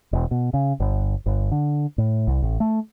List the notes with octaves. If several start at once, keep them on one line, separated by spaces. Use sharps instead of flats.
E1
B2
C#3
G1
G1
D3
A2
C2
A1
A3